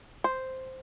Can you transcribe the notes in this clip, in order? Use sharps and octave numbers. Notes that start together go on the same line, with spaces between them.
C5